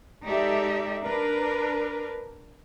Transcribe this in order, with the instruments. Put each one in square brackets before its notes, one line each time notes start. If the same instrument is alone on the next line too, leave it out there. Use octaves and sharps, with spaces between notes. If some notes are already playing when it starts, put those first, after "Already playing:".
[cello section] G#3 D#4 G4 A4 D5 E5
D4 A#4 B4